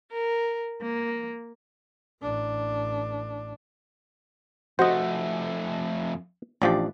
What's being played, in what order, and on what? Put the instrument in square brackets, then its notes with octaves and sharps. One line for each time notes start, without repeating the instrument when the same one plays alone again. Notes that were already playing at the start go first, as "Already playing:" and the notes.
[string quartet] A#4
A#3
[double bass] A1 D4
[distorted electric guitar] F2 A3 [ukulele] F#4 [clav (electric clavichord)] C5 D#5
[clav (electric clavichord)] A1 F3 G4 [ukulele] D4 D5